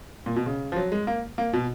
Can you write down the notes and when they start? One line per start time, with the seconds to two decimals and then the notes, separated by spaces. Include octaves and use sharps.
0.26 A#2
0.36 B2
0.46 C#3
0.72 F3
0.76 F#3
0.92 G#3
1.07 A#3
1.38 A#3
1.53 B2